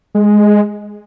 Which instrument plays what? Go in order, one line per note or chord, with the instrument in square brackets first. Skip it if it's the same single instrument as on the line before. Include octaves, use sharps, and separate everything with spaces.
[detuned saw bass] G#3